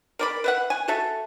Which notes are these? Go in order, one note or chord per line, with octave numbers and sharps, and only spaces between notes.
A#4 D5 B5
B4 E5 F#5
G#5
F#4 A4 E5